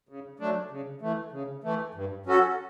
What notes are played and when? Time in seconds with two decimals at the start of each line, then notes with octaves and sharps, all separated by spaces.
0.09 C#3
0.40 F#3 A3 D4
0.71 C#3
1.02 E3 A3
1.32 C#3
1.64 E3 A3
1.94 G2
2.26 F#3 C#4 F#4 A4